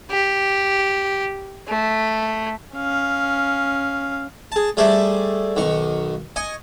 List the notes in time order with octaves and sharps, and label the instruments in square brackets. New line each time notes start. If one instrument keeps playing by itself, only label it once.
[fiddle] G4
A3
[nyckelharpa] C#4 F5
[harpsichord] G#4 A5
G3 A3 G#4 C5 D5 E5
B1 D#3 C#6
D#5 G#5 C#6